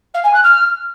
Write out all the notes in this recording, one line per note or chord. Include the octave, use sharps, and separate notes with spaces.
F5
G#5
F#6
F6